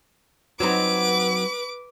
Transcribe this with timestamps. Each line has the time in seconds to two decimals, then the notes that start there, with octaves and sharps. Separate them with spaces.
0.60 F#3 C4 D#4 B4 D6